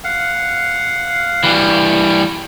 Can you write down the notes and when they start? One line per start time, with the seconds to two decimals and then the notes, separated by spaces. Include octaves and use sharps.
0.04 F5 F#5
1.43 E3 G3